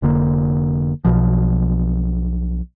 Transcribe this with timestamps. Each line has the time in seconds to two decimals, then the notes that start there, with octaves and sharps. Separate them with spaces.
0.02 F1 D3 A#3
1.05 B1 B2 F3